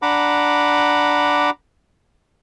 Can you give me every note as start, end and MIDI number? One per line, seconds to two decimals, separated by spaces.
0.02 1.50 62
0.02 1.50 78
0.02 1.50 82
0.02 1.50 83
0.02 1.50 86